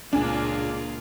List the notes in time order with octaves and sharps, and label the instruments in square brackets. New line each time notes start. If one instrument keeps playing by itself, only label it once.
[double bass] C#2 A#2 [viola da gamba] A#3 F4 G#4 [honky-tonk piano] D4 G#5